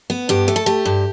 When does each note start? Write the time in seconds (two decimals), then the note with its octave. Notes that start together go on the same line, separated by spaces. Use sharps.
0.10 B3
0.29 G2 G4
0.48 A3
0.56 A4
0.66 A3 G4
0.85 G2